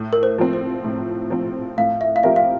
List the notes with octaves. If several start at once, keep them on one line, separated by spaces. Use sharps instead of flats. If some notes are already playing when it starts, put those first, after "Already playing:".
Already playing: A2
A#4
C5
F3 C4
C5
A2
F3 C4
A2 F5
E5
F5
F3 C4 G4 A#4 E5
F5